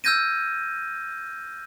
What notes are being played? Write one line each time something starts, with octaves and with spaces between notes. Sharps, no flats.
E6 F6 G6 G#6 A#6 D#7